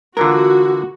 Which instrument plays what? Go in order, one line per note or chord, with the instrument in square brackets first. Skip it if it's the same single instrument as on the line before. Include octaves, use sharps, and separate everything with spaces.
[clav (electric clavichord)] D3 E3 G#3 [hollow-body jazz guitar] F4 A#4 [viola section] F#4